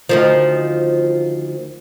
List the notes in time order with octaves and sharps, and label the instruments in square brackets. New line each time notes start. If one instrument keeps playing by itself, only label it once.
[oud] D2 D#3 F3